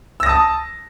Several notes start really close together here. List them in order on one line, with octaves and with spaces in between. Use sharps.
E6 A#6 D#6 A5